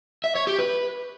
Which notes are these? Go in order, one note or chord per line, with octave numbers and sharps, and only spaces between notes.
E5
C#5
G4
B4